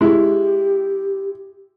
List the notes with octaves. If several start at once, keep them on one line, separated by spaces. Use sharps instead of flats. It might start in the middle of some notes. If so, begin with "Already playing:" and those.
G#3 E4 G4